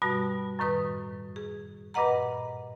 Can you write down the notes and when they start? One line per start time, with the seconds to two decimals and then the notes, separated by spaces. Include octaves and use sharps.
0.02 G2 B2 G3 F#4 A5
0.59 F#2 A2 D#3 B4 D#6
1.36 G#4
1.94 G2 A#2 B4 D#5 F#5 A#5